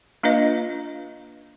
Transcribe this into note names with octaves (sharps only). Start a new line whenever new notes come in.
A#3 D4 F4 B4 D#5 F5